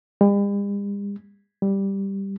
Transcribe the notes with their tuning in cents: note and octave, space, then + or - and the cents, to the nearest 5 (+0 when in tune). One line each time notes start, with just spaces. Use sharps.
G3 +45
G3 +0